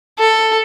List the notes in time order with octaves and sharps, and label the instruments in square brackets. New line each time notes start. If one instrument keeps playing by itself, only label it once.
[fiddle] A4